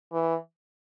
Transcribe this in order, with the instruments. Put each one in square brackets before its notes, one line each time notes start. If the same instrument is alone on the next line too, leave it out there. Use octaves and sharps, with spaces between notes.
[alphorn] E3